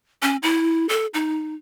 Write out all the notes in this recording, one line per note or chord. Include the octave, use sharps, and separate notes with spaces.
C#4
E4
A4
D#4